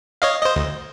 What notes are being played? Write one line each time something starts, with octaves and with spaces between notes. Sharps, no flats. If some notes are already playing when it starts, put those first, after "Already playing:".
C#5 D#5 F5
C5 D#5
D2